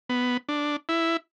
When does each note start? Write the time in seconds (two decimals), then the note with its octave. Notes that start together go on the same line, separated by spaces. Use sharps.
0.09 B3
0.49 D4
0.89 E4